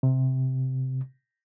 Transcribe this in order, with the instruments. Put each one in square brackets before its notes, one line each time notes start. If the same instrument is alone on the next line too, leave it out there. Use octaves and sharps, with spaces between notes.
[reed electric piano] C3